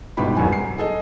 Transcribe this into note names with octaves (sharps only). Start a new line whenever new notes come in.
G1 G#2 B2 G4 B5
E1 C2 F#2 F#3 G#5
C7
G#4 A4 D#5